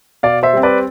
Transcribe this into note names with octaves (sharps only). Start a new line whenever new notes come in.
B2 D5 F5
C5 E5
G3 C4
B4 D5